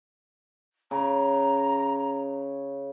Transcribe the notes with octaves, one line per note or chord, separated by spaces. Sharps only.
C#3 A#5